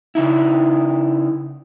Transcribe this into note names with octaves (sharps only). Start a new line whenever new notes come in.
C#3 D#4 E4